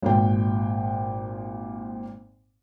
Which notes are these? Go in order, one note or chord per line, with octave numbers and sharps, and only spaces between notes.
G#1 A#2 G5